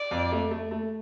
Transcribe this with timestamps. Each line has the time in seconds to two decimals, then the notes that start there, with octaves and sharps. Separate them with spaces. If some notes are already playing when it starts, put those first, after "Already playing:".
Already playing: D5
0.11 F2
0.32 A3
0.51 A3
0.71 A3